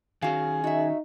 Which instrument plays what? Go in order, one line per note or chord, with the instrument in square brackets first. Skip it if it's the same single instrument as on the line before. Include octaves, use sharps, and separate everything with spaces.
[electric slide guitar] D#3 C#4 [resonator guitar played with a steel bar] F#4 F5 [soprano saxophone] G#4
[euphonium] D#4 [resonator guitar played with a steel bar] F#4 E5